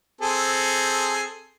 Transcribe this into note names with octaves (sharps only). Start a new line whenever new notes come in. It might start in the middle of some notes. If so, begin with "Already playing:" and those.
C4 G#4 A4